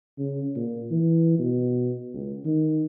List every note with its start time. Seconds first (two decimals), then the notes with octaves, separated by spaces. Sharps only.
0.19 C#3
0.56 A#2
0.91 E3
1.39 B2
2.14 C#2
2.45 D#3